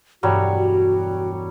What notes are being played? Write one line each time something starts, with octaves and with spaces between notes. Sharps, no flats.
E1 G2 F#3 G3 A3 F#4 C#5